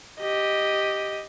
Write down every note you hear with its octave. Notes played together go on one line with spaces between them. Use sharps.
G4 D#5